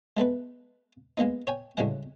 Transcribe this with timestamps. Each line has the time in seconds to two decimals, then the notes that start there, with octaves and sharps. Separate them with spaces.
0.17 G#3 A3 B3 B4
1.17 G#3 A#3 B3 D#4
1.47 C#5 G5 G#5
1.77 D2 A2 C#3 G3 G#3 F#5